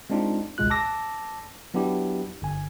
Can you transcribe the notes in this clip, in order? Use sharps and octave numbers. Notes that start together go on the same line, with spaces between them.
G#3 C4 D4 D#4 F4
G#1 C#2 B2 G#3 F4 F#6
A5 D6 E6 A#6
F#3 B3 D4 E4 G4
G1 G#5